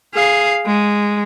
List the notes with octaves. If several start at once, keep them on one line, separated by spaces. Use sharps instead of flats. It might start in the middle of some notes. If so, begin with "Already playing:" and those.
G#4 F5
G#3